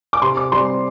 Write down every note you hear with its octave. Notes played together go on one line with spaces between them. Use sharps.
D6
C3 C6
D6
G3 C4 C6